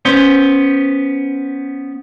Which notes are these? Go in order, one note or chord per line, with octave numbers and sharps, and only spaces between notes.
B3 C#4 C5